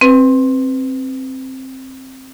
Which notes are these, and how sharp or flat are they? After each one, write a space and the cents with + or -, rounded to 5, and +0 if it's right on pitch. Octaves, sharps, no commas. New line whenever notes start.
C4 +10 B4 +15